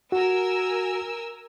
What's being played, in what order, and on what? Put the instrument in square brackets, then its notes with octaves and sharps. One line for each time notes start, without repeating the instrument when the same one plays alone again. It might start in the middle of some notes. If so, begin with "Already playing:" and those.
[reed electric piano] F#4 [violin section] A#4 G#5 E6